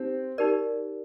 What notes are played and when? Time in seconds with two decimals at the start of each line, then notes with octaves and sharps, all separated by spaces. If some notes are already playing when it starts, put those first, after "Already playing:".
Already playing: C4 D#4 G4
0.38 D#4 G4 A#4 D5